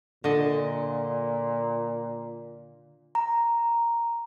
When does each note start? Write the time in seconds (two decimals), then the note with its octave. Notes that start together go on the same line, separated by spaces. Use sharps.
0.24 A#2 D3 D#5
3.15 A#5